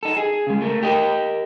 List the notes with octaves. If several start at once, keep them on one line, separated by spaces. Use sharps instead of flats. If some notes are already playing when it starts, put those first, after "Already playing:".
D#4 A4
G#4
C#3 G#3
A3 A#4
G4 A#4 D#5